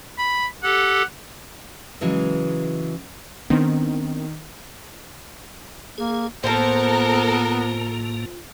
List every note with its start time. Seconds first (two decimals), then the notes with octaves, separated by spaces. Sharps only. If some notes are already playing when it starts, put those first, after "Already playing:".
0.18 B5
0.63 G4 A4 F#5
2.01 C#3 E3 F#3 G#3
3.50 D#3 B3 C4 D4
5.98 A#3 G#4
6.44 A2 F3 A#3 B3 A4 A#4 C5